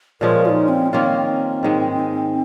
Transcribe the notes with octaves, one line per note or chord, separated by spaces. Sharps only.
A#2 F3 G#3 C#4 A#4
F4
D#4
C4
D#3 A#3 C4 C#4 F4
G#2 D#3 G#3